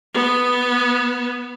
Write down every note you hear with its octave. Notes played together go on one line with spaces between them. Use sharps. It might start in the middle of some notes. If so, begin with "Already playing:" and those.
B3